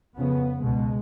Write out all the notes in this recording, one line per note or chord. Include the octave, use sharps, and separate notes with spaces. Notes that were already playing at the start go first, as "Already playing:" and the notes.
F2 C#3 B3
C#2 B2 G#3